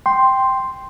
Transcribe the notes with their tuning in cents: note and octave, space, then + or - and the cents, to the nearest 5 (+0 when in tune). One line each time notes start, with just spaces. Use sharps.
G5 +0 C6 +0